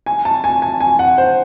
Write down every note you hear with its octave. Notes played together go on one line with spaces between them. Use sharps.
G#5
A5
G#5
G#5
G#5
F#5
C5